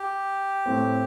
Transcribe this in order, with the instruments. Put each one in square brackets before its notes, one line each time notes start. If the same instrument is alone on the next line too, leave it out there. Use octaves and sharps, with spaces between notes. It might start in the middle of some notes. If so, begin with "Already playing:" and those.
Already playing: [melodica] G4
[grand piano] A2 A3 C4